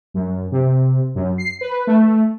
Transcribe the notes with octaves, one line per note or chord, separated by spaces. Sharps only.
F#2
C3
F#2
C7
B4
A3